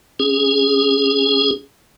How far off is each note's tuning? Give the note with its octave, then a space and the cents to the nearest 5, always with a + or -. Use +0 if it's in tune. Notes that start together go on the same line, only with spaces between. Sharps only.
C#4 +0 G#4 -5